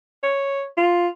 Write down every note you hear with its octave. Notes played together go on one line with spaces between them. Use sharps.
C#5
F4